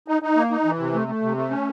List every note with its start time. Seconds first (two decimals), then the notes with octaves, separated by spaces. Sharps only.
0.08 D#4
0.22 D#4
0.36 A#3
0.51 D#4
0.65 E3
0.79 C3
0.94 A3
1.08 A3
1.22 C3
1.37 A3
1.51 C#4